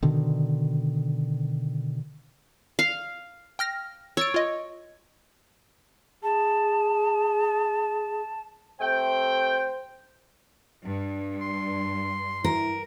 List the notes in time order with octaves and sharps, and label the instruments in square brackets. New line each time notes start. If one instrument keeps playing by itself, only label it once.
[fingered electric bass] B2 D3 D#3
[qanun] F5
[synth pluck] G5 F6 A#6
[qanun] C#5 [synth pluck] E6 A6 D7
[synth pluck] F4 D#5
[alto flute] G#4 [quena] A5
[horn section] C3 A3 G5 [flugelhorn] C5
[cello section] G2 [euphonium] D4
[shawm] C6
[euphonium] E4 [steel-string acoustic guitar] A#4